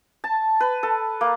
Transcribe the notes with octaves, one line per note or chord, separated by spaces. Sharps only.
A5
B4
A4
A#3